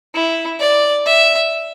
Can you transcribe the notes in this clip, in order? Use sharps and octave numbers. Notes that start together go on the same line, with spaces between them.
E4
D5
E5